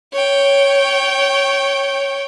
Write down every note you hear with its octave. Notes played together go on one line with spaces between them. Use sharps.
C#5 G5